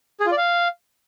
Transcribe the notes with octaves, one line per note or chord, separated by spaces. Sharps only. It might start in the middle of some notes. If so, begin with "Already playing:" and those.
G#4
F4
D5
F5